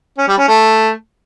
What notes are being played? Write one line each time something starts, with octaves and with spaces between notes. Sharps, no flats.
C#4
G3
C#4
A3